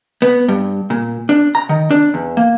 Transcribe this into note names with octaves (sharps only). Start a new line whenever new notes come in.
B3
G2
A#2
D4
A#5
D#3
D4
E2
A#3